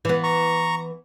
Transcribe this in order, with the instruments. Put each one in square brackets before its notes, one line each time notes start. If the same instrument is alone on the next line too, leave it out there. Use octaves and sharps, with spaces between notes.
[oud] E3 B3
[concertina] A#5 C#6